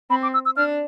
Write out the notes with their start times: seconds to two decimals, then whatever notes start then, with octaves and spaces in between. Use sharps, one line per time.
0.10 C4 B5
0.23 D6
0.34 E6
0.45 E6
0.57 D4 F6